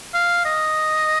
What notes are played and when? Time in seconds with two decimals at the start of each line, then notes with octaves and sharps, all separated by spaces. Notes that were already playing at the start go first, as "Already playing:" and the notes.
0.14 F5
0.45 D#5